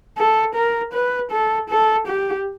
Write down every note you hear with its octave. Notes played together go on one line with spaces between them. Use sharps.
A4
A#4
B4
A4
A4
G4